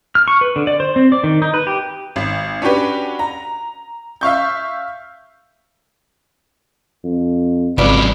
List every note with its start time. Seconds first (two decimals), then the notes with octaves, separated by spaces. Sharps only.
0.15 F6
0.28 C#6
0.41 B4
0.56 D3
0.67 D5
0.80 C5
0.96 C4
1.12 D5
1.24 D#3
1.42 D#4
1.54 B4
1.67 G4
2.16 G#1
2.62 C#4 D4 F#4 G4 B4
3.19 A#5
4.21 E5 F5 C#6 G6
7.04 F2
7.78 G#1 F2 G#2 C#3 F#3 B4 D5